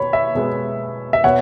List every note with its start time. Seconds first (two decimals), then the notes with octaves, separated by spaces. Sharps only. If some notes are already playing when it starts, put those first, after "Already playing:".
Already playing: B2 B3 C#5 B5
0.13 E5
0.35 B2 G#3 B3
1.13 E5
1.24 B2 B3 C#5 F#5